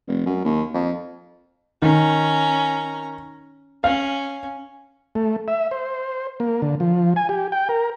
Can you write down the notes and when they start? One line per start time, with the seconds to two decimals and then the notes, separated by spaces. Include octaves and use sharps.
0.08 F1
0.26 F#2
0.45 D#2
0.74 F2
1.82 D#3 C#4 A#5
3.84 C#4 F5
5.15 A3
5.48 E5
5.71 C5
6.40 A#3
6.62 D3
6.80 F3
7.16 G#5
7.29 G4
7.52 G5
7.69 A#4